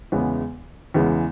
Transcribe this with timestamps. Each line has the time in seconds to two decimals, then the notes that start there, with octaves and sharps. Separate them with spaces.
0.12 E2 C#3 E3 G#3 B3
0.94 E2 C#3 E3 G#3 B3